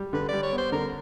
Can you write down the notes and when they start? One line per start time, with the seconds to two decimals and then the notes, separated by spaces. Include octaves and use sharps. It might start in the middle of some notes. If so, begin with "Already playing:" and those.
Already playing: G3
0.13 D3 B4
0.28 G3 D5
0.43 C#5
0.52 B3
0.58 C5
0.72 D3 A#4